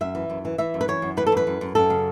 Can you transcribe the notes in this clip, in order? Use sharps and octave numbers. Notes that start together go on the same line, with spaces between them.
F#2 E5
E3
F#2
E3
E3 E5
F#2
B4
E3 C#5
F#2
E3 B4
A4
F#2 B4
F#2
F#2
F#2 A4
C#3